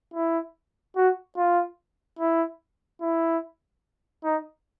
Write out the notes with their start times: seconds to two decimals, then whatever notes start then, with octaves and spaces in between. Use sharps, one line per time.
0.14 E4
0.96 F#4
1.37 F4
2.19 E4
3.01 E4
4.24 D#4